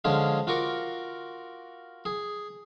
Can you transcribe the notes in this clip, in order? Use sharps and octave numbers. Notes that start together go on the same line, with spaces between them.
D3 F3 G#3 C#4 F4 G#4
F4 F#4 A#4 C#6 D6
G#4